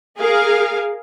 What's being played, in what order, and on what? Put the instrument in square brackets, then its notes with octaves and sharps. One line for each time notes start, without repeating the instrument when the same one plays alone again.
[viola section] G#4 A#4 F5